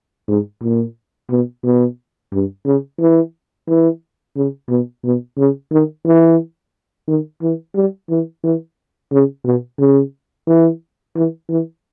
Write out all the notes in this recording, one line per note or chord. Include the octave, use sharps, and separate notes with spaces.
G#2
A#2
B2
B2
G2
C#3
E3
E3
C#3
B2
B2
C#3
D#3
E3
D#3
E3
G3
E3
E3
C#3
B2
C#3
E3
E3
E3